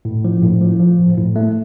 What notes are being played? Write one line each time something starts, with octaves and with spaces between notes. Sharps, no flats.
A2
F3
A2
F3
F3
A2
A2
A3